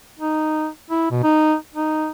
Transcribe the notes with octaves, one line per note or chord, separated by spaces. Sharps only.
D#4
E4
B2
D#4
D#4